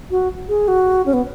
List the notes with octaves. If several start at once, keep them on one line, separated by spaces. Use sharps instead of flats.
F#4
G#4
F#4
C#4
B3